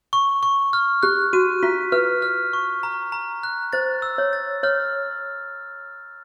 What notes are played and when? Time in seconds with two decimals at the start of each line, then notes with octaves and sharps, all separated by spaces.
0.13 C#6
0.43 C#6
0.73 F6
1.03 G4 F#6
1.33 F#4 D#7
1.63 F4 B6
1.92 B4 F6
2.22 F6
2.53 C#6
2.83 A#5
3.12 A#5
3.43 F#6
3.73 C5 A6
4.02 E6
4.18 C#5
4.33 A6
4.63 C#5 F6